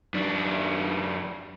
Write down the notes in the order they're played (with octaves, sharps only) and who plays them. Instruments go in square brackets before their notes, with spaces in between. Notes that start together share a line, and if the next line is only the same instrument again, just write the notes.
[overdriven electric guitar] F#2 D4